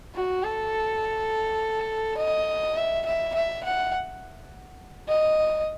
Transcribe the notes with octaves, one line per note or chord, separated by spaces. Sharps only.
F#4
A4
D#5
E5
E5
E5
F#5
D#5